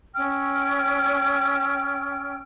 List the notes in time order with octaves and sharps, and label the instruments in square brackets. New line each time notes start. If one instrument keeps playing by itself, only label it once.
[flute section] C#4 G5 E6 F6